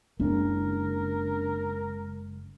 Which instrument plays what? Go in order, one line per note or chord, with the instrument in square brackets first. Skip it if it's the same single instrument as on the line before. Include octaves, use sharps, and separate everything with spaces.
[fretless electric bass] F#1 [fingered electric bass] G#3 C#4 D4 [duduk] A#4